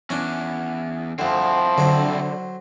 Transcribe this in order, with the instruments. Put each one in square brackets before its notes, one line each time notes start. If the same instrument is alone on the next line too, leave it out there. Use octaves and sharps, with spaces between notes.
[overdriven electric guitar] E2 [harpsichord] C#4 D4
[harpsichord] D2 D3 [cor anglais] F3 [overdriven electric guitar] C4 E4
[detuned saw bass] D3 [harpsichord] F#3 C5